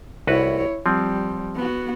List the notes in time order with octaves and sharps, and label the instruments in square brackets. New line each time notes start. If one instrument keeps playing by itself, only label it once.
[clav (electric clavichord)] C2 F#4 B4 [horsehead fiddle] E4 C#5
[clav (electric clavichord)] F3 C4 [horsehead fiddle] G3
[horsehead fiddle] B3 F#4